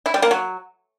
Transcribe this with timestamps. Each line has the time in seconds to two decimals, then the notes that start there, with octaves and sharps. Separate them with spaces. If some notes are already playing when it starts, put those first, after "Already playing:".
0.06 E4
0.14 G3
0.22 A#3
0.31 F#3